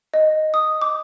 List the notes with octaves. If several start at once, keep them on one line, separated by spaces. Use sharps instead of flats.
D#5
D#6
D6